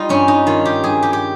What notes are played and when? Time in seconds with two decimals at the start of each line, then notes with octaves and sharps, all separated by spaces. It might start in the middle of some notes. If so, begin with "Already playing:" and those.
Already playing: G3 D#4 F4
0.09 G2 C#4
0.28 D#4
0.47 D#3 F4
0.65 G4
0.84 G2 G#4
1.03 G4
1.13 G4